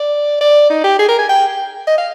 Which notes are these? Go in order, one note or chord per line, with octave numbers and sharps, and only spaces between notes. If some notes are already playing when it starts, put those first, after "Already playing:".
Already playing: D5
D5
D#4
G4
G#4
A#4
G#5
G5
D#5
F5